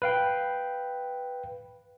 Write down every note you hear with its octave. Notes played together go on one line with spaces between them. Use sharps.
B4 F5 G5